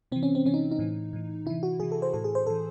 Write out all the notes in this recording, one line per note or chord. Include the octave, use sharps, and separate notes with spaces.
C3 E3 C4
C#4
C4
C3 E3 C#4
D#4
D#4
A2 E3
A2 E3
C3 E3 E4
F#4
C3 E3 G#4
A4
C5
A2 E3 A4
G#4
C5
A2 E3 A4